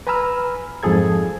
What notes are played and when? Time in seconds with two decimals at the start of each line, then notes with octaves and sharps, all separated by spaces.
0.07 B4 G#5 A#5 B5 E6 F6
0.83 F2 G#2 F3 G#4 A4 G#6